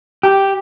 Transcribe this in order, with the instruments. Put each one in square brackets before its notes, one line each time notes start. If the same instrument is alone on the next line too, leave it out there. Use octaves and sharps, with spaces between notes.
[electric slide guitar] G4